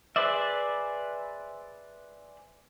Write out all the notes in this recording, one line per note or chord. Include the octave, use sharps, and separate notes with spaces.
G#4 B4 C5 D5 E5